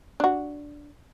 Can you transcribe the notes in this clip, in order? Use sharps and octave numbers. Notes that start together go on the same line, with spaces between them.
D4 F#4